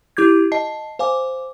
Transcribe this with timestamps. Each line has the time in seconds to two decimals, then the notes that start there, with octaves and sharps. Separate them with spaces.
0.17 E4 G4 D6 G6 G#6
0.52 D#5 A5 C7
0.99 C5 F5 G#5 D6